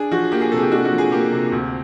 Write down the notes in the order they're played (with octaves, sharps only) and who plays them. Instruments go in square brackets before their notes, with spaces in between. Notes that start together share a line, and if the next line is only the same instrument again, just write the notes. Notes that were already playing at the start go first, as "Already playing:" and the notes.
Already playing: [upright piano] D4 G#4
F3 F#4
A#3 G4
G#4
C3 A4
G#4
G4
D4 F#4
F#4
F3
G#4
A#3 G4
C3
D2